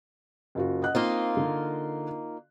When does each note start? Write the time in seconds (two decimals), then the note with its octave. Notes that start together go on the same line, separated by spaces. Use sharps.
0.55 F#1 F4 F#4
0.82 D#5 F#5 F#6
0.95 A#3 C4 D#4 F4
1.37 D3